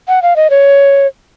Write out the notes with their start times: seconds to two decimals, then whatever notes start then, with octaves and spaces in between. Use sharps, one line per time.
0.08 F#5
0.22 F5
0.36 D#5
0.50 C#5